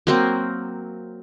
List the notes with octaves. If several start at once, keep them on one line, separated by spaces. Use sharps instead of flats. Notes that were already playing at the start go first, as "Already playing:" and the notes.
F#3 A#3 C4